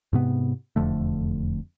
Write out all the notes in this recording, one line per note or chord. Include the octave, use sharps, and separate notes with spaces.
G#2 C3 B3
E1 F2 D3 A3